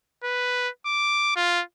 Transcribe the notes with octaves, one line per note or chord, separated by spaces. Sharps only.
B4
D6
F4